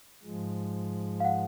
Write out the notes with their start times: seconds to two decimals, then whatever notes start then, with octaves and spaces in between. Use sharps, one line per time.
0.23 G#2 F3 G#3
1.20 F5
1.25 F#5